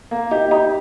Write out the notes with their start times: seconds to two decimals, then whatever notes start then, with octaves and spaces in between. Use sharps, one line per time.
0.11 A#3
0.31 D#4 G4
0.51 D#4 G4